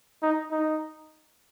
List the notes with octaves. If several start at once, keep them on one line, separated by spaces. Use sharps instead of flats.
D#4
D#4